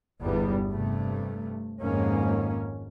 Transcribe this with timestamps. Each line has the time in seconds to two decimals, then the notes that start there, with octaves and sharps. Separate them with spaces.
0.22 G1 E2 G3 B3
0.71 G2 C3 A3
1.82 G#1 F2 G#2 A#3 C#4